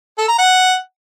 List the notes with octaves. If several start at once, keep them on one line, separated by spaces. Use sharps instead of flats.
A4
A#5
F#5